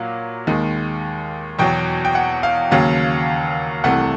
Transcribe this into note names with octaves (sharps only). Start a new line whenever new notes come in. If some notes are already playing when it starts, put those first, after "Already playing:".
Already playing: A#2 F#3 A#3
D#2 D#3 G#3
E2 B2 F#3 G5
G5
F#5
F5
D#2 C#3 F#3
C2 C3 E3 A3 F#5